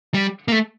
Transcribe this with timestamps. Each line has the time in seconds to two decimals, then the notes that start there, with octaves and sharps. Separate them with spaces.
0.14 G3
0.48 A#3
0.52 A3